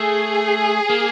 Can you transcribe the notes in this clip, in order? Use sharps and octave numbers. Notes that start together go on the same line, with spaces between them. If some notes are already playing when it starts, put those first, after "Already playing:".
Already playing: A3 G#4
A#3